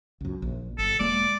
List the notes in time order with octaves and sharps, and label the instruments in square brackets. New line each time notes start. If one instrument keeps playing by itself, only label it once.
[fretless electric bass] C#2 F#2
A#1
[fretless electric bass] G1 [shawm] A4
[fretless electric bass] E1 G#3 A#3 [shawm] D5